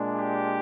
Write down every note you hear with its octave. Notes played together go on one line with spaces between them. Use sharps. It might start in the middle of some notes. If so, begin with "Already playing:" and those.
Already playing: A#2 G#3 D4
G4